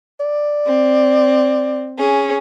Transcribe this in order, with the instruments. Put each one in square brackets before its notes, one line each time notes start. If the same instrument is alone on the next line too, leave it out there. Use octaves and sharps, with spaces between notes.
[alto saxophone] D5
[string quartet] C4
C#4 G#4